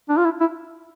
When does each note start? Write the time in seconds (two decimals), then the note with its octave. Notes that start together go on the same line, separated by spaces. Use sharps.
0.09 D4
0.17 F4
0.25 E4
0.40 E4